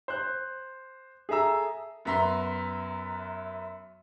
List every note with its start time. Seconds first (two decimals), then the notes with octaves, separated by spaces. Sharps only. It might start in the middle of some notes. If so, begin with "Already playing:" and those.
0.08 C5 F#6
1.29 G#4 A4 E5 A#5 E6
2.05 F#2 B3 E5 A#5 C6